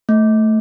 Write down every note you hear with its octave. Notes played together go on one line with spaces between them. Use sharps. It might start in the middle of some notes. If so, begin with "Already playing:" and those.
A3